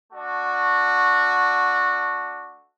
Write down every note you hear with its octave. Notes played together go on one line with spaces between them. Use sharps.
A3 D4 F#4